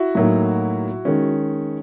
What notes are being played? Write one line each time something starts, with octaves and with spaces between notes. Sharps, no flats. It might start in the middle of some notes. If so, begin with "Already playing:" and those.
Already playing: E4 F#4
A2 F#3 A#3 D#4
D#3 G#3 C#4